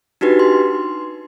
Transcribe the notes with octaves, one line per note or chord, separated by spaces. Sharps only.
D4 D#4 F#4 G4 B4
C6